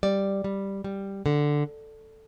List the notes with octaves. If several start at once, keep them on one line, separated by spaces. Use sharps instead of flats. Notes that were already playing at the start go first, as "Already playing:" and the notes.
G3 D5
G3
G3
D3